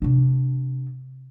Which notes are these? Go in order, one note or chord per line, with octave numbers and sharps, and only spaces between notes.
C3 D4